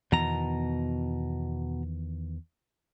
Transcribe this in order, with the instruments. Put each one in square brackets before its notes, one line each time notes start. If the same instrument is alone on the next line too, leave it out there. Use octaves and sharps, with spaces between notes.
[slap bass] E2 D#3 E3 [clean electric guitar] B2 A#5